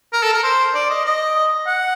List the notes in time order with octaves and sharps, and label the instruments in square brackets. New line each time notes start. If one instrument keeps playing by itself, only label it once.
[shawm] A#4
A4
A#4
C5
D5
D#5
D#5
F#5